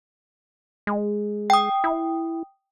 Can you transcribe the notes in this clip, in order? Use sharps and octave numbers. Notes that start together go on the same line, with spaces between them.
G#3
G5 D#6
E4